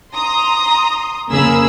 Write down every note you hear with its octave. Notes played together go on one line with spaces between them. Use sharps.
A#5 C6 D#6
F2 C#3 A#3 G#4 B5 E6